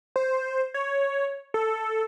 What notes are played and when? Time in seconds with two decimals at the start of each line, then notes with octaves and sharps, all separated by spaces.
0.16 C5
0.74 C#5
1.54 A4